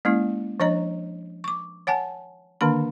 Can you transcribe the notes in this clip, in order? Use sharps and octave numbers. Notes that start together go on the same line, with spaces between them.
G#3 A#3 C#4 E4
F3 D4 C#5 D#5 A#5
C#6 D6
C#5 F#5 G#5 A5
D3 D#3 A#3 D4 B5